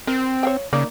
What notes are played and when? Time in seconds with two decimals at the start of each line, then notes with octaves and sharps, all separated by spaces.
0.07 C4 A#4
0.43 C#5 F5 G5
0.73 C#3 A#3 D#4 D5